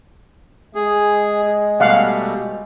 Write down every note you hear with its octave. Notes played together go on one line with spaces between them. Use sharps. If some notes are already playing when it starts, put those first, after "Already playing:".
G#3 G#4
B2 G3 A3 F5 F#5